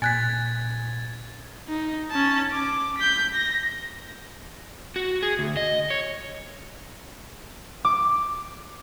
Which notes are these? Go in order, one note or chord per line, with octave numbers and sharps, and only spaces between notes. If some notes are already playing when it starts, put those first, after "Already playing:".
A#2 G#5 F#6 G#6 A6 B6
D#4
C#4 A5
D6
G6 B6
A#6
F#4
G#4
D2
D#5
C#5
D6